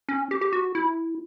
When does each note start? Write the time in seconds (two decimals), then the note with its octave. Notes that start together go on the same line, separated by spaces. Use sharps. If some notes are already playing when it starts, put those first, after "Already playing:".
0.09 C#4
0.31 G4
0.41 G4
0.53 F#4
0.75 E4